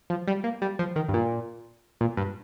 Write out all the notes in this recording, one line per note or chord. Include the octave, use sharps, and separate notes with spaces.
F3
G3
A#3
G3
F3
D#3
G2
A#2
A#2
G2